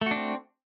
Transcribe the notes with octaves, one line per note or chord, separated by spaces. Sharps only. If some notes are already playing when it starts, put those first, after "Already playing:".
A3 C4 D4 F#4